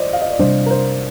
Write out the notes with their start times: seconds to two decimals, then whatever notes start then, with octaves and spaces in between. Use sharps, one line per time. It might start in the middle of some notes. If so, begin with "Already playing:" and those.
Already playing: C5 D5 D#5
0.13 F5
0.22 D#5
0.30 D5
0.39 C3 G3 D4 C5
0.66 A#4
0.70 C5